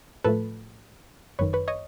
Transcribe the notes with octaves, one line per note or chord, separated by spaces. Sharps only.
A2 F3 A3 A4 B4
G1 F#2 D#3 B4 C#5
B4 C#5
C#5 D#5